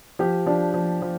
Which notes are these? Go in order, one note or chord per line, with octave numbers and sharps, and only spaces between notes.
F3 G4
F3 D4
F3
F3